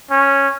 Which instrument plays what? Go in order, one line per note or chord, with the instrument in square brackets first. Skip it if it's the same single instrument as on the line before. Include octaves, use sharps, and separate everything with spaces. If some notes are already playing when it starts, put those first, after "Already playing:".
[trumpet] C#4